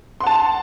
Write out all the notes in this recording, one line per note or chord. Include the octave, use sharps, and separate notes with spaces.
F#5 A5 C6